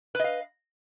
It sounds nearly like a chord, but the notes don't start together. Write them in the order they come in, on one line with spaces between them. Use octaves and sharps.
B4 D#5 F5